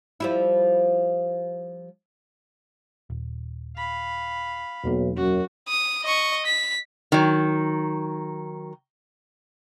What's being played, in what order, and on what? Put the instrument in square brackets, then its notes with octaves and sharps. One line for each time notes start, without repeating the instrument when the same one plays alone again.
[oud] F3 G3 E4
[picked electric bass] D#1
[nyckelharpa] F5 B5
[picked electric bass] E1 A#3 [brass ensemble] B1
[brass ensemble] F#2 [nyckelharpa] F#4
[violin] D#6
D#5 C#6
B6
[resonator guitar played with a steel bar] D#3 F#3